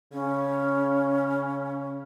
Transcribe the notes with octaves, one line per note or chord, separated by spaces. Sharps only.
C#3 C#4